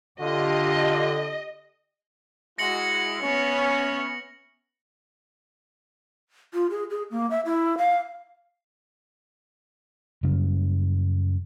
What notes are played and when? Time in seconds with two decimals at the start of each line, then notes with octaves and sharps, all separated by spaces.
0.21 D3 F4 G4 D#5
2.58 G#3 E4 F#4 A#6 C#7 F#7
3.21 B3 C#4 C#5 E5
6.54 F4
6.71 G#4
6.90 G#4
7.11 A#3
7.31 E5
7.45 E4
7.78 F5
10.23 F#2 C#3 G3